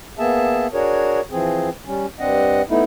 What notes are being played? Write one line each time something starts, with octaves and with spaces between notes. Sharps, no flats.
A#3 B3 G#4 E5 A5
D4 F#4 G#4 A#4 C#5
E3 F3 C4 G#4
G3 C#4
G2 C4 D4 D#5 F#5
A3 B3 D#4 E4